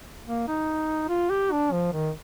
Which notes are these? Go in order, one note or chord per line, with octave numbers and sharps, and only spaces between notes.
A#3
D#4
F4
G4
D4
F3
D#3